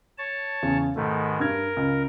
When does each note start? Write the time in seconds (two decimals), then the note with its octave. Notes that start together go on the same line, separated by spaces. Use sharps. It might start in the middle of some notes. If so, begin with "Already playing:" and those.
0.18 C#5 A5
0.63 E2 C#3
0.96 G#2 B2 D#3 A3
1.40 G2 A#4 G#6
1.76 C#2